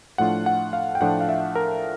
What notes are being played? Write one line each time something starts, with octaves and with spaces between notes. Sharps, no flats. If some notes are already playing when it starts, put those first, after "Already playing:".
A2 F3 A3 D4 F4 F#5
F#5
F5
G5
A2 F3 A3 D4 F4 F#5
F5
E5
A#4